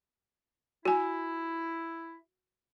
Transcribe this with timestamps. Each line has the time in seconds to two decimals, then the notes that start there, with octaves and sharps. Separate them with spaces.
0.85 E4 F#4 G#5